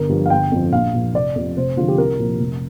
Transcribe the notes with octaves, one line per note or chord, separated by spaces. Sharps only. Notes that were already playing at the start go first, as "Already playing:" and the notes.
Already playing: G1 A#4
G2 F3
F5
G1 G5
F2 D3 F3
A#1 F5
A#2 F3
F1 D5
F2 C3 F3
F1 C5
F2 D3 F3 F4
G4
C2 A#4
A#2 F3
F1